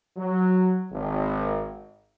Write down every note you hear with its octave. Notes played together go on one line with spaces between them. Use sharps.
F#3
G#1